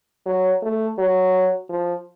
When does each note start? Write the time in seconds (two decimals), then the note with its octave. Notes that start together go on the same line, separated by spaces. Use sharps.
0.26 F#3
0.62 A3
0.98 F#3
1.69 F3